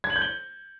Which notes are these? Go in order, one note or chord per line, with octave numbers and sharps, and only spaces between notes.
G#6
F#7
G6
G7